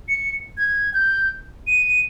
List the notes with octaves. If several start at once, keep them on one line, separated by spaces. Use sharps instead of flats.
C#7
G#6
G6
D#7